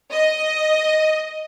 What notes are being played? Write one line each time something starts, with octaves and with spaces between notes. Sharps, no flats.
D#5